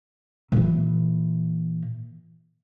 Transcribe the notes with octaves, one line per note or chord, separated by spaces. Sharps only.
A#2 E3